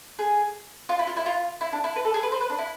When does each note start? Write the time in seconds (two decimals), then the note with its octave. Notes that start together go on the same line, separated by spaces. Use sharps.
0.19 G#4
0.89 F4
0.99 E4
1.07 F4
1.17 E4
1.26 F4
1.61 E4
1.73 D4
1.84 E4
1.96 B4
2.05 A4
2.14 G#4
2.23 B4
2.32 C5
2.41 B4
2.50 D4
2.58 E4